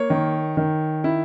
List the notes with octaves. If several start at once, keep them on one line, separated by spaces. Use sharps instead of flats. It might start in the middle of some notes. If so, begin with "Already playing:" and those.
Already playing: A#3 C#5
D#3
D#3
E4